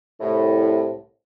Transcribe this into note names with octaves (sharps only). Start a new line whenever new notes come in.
C2 A2